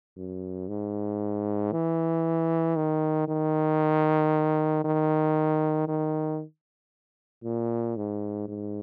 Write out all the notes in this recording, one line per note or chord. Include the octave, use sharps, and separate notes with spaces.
F#2
G#2
E3
D#3
D#3
D#3
D#3
A#2
G#2
G#2